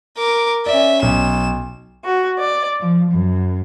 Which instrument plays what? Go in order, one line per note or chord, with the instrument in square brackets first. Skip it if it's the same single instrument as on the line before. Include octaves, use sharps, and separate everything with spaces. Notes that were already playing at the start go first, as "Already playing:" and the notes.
[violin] A#4 D6
[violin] C#4 E5 [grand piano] D5
[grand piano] B1 [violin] E7
[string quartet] F#4
D5
F3
F#2